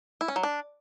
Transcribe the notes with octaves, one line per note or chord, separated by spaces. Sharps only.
E4
C#4
F#3
D4